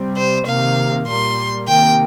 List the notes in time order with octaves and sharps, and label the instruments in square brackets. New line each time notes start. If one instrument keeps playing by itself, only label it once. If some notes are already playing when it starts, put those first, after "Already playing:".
Already playing: [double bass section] C3 G3 C4
[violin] C5
[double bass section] C3 D#3 A#3 [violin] F5
[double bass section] A#2 G3 A#3 [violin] C6
[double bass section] C3 D#3 A#3 [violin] G5